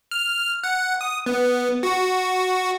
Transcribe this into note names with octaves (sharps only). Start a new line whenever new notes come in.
F6
F#5
D#6
B3
F#4